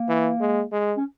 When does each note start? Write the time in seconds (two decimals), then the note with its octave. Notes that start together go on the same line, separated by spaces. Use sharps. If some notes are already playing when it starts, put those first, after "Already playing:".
Already playing: A#3
0.09 E3
0.40 G#3
0.72 G#3
0.97 C#4